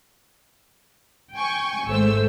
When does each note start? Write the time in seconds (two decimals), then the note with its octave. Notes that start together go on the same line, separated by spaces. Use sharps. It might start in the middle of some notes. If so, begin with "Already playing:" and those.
1.34 G5 G#5 C#6
1.87 G#1 G#2 A3 C5 E6